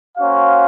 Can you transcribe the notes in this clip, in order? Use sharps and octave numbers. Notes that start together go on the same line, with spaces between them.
A#3 C#4 F#4 C5 F5